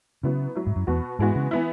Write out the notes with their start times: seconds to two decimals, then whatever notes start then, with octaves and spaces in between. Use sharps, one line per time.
0.23 C#3 F#3 B3 E4
0.55 F#3 E4
0.66 G#2
0.76 F#2
0.87 E2 B2 B3 F#4
1.19 G#2 E3 G#3 B3 F#4
1.35 C#3
1.51 E3 B3 E4